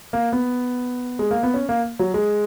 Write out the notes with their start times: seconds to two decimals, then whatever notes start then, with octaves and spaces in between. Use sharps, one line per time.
0.13 A#3
0.33 B3
1.19 G#3
1.31 A#3
1.43 B3
1.54 C#4
1.69 A#3
1.99 F#3
2.14 G#3